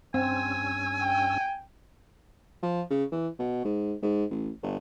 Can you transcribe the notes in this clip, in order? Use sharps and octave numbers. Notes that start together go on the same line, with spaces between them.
G2 C4 C#4 G#5 E6
G5
F3
C#3
E3
B2
G#2
G#2
A1
G1